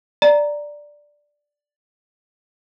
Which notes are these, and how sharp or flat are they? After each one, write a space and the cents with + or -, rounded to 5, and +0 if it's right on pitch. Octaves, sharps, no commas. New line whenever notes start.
D5 +0 A#5 +0